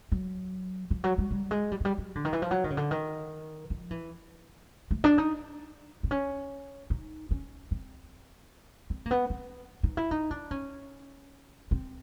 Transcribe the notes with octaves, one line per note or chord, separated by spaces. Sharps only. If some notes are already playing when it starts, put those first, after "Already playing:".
F#3
F3
F#3
G3
G3
G#3
G3
F#3
G3
F#3
D3
D#3
E3
F3
F#3
D#3
C#3
D3
D#3
F3
E3
A3
D4
D#4
C4
C#4
D#4
C#4
C4
C4
A#3
B3
C4
D#4
E4
D#4
D4
C#4
C4